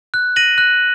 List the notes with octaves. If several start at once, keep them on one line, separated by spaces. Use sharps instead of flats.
F#6
A#6 D#7 F#7
F#6